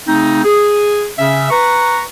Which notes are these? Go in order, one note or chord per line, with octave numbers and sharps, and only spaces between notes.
C#3 A3 C4 D#4
G#4
C#3 C#4 E5
B4 A#5 C#6